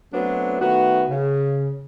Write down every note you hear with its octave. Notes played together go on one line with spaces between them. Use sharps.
F#3 A3 B3 C4 D4 F#4
D#3 A3 B3 F#4
C#3